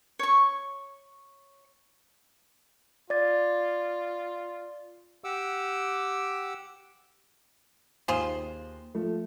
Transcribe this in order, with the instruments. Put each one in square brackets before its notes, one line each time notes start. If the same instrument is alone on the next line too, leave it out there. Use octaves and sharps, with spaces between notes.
[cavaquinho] C#5 C#6
[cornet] F4 [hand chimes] D5 A6
[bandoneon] G4 F#5 D6 E6
[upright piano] D#2 [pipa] F4 G#4 C5
[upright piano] F3 A3